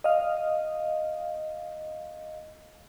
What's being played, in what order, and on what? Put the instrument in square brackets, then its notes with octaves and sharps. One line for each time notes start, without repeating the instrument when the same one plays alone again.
[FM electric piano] D#5 F5